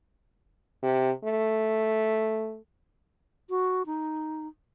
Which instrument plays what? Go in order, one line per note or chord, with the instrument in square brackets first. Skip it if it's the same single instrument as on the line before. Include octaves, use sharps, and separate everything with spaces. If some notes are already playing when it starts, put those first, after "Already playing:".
[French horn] C3
A3
[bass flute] F#4
D#4